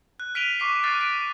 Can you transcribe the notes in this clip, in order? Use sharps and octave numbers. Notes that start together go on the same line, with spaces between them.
F#6
F6 B6 D7 D#7 F7 G7
C#6 D6 B6 C7
C#6 F6 F#6 A6 C7 D7
A6 B6 D7